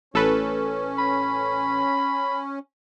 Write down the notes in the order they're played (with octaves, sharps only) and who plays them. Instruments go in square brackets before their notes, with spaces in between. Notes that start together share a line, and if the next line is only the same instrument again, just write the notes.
[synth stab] A1 A4 B4 [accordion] C#4
[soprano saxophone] B5